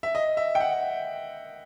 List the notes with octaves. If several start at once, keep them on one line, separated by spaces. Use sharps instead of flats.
E5
D#5
E5
G5
F#5